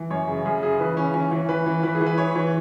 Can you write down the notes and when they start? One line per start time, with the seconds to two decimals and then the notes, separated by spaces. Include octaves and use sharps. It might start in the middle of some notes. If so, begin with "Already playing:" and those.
Already playing: E3
0.10 F#2 C#5
0.28 C#3
0.46 F#2 G#4
0.63 C#3 G#4
0.80 E3 B4
0.97 E3 C#4
1.14 E3 C#4
1.31 E3 C#4
1.49 E3 B4
1.66 E3
1.83 E3 B4
1.95 G#4
2.01 E3
2.06 B4
2.18 E3 C#5
2.35 E3 C#5